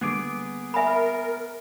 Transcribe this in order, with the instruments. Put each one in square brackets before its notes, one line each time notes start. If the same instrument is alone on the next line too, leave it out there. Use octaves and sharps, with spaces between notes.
[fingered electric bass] D3 G3 A#3 [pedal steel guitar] B3 G#4 D6
[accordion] A#4 [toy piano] E5 G#5 B5